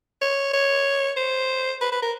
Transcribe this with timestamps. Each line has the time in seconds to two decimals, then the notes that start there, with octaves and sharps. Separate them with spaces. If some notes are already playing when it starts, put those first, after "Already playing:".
0.21 C#5
0.53 C#5
1.17 C5
1.81 B4
1.92 B4
2.02 A#4